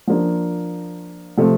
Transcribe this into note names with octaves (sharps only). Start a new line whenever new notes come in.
F3 A#3 D4
C3 F3 A3 C4